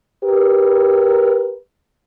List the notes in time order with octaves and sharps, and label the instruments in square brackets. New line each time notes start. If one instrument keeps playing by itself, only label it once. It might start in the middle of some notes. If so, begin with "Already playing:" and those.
[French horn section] G4 A#4 B4